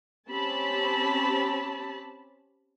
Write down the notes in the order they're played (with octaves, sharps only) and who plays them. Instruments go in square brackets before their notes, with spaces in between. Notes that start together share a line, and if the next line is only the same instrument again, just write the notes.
[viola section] C4 C#4 G4 A5 B5